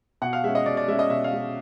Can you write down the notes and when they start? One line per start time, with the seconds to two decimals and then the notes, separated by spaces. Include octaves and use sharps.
0.22 B2 F#5
0.33 F5
0.44 G#3 C#4 E5
0.55 D#5
0.66 B2 D5
0.77 D5
0.88 G#3 C#4 E5
0.99 D#5
1.10 B2 E5
1.24 F5
1.33 G#3 C#4